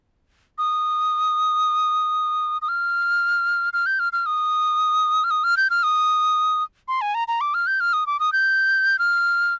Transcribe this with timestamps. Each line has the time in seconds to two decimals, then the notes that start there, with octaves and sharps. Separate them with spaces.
0.58 D#6
2.62 D#6
2.69 F6
3.73 F6
3.86 G6
3.99 F6
4.13 F6
4.26 D#6
5.24 F6
5.31 D#6
5.44 F6
5.57 G6
5.70 F6
5.83 D#6
6.88 C6
7.01 G#5
7.15 A#5
7.28 A#5
7.41 D6
7.54 F6
7.67 G6
7.80 F6
7.93 D#6
8.07 D6
8.20 D#6
8.33 G6
8.99 F6